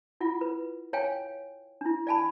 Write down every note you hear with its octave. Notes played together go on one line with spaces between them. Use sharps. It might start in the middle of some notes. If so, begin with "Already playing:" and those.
E4 F4 F#5
B4
C#5 F5 G5 G#5
D4 E4
D5 F5 G#5 A5 B5